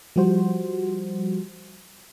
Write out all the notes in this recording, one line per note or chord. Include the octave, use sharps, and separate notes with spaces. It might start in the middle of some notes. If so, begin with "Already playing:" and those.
F3 G3 F#4 C5